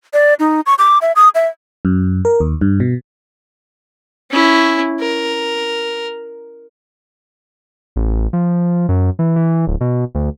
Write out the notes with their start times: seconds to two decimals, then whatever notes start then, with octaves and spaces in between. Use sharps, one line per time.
0.13 D5
0.39 D#4
0.66 C#6
0.79 D6
1.02 E5
1.16 D#6
1.35 E5
1.85 F#2
2.25 A#4
2.40 D#2
2.61 G2
2.80 B2
4.31 C#4 E4
5.00 A#4
7.96 A1
8.33 F3
8.89 F#2
9.19 E3
9.36 E3
9.67 D1
9.81 B2
10.15 D2